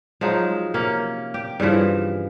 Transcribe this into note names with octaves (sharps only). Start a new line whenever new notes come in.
F3 F#3 G#3 D#4
C3 A#3 C#4
G4
G2 C#3 E3 F3